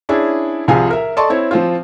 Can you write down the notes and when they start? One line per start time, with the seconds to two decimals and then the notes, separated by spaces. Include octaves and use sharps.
0.09 C#4 D4 E4 G#4
0.68 C2 C3 F3 G#4 F5 G#5
0.90 A#4 E5
1.17 A4 D5 D#5 A5 C6 C#6
1.30 C4 E4 C#5
1.51 F3 C4 F4